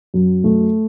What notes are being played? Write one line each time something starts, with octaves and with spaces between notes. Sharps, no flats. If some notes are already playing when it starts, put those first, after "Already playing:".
F#2
A3